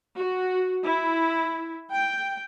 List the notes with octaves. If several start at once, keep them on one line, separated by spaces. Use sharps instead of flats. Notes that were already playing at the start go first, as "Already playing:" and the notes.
F#4
E4
G5